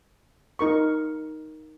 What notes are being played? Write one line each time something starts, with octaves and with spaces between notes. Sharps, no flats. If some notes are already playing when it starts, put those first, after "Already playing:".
D#4 A#4 C#6